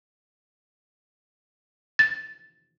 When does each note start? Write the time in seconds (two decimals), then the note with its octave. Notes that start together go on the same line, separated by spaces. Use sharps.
1.99 A6